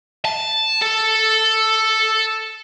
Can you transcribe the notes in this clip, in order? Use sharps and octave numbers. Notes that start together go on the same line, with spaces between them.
A5
A4